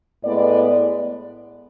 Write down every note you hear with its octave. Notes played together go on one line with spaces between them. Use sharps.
A2 G#3 B3 D5